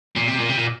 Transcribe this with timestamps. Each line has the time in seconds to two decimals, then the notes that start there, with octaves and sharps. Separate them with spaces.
0.16 A#2
0.28 C3
0.39 A#2
0.49 C3
0.57 A#2